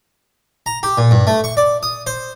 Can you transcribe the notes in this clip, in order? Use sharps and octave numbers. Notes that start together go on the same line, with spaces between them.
A#5
G4
A#2
G2
A3
C#6
D5
D#6
C5